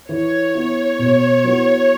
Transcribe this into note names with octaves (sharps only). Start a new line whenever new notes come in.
E3 C#5
B3 E4
B2
F#3 B3 E4